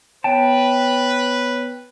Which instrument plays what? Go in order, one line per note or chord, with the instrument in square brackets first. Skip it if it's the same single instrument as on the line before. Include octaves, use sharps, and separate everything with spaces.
[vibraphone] B3 C#5 [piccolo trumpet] B4 [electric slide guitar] G5 A5